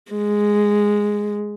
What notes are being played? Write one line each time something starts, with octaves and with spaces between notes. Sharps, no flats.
G#3